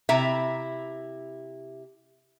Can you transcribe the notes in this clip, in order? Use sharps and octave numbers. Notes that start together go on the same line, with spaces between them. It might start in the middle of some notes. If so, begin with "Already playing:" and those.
C3 E4 E5 A#5